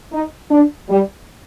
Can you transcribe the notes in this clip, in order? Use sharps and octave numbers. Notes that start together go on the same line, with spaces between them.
D#4
D4
G3